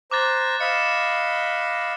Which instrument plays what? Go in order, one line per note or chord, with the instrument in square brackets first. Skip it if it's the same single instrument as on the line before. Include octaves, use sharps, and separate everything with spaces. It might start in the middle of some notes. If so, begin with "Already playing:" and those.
[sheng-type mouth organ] C5 A#5 [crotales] D6 F#6 A6
[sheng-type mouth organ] D#5 F5 B5 [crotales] C#7 E7